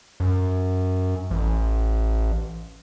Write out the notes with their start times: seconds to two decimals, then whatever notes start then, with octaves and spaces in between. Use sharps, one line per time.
0.20 F#2
1.31 A1